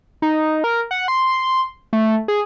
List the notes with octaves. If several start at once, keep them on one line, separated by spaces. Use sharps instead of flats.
D#4
A#4
F#5
C6
A3
G#4